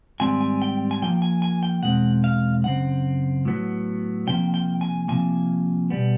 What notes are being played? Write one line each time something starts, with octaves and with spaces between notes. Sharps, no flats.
G#2 D#3 G3 C4 G#5
G#5
G5
G#5
A2 F3 A#3 G5
G#5
G#5
G5
E2 B2 G#3 C4 F#5
F5
F#2 C#3 C4 F#5
A2 F#3 B3
C3 F3 A#3 G5
G5
G#5
C3 F3 A#3 G#5
B2 G3 B3